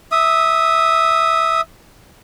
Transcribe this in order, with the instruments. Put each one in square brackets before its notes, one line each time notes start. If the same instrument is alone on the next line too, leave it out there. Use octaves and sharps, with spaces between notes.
[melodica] E5 D#6